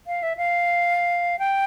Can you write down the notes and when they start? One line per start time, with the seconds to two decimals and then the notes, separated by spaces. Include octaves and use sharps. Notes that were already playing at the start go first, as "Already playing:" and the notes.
0.07 F5
0.23 E5
0.37 F5
1.39 G5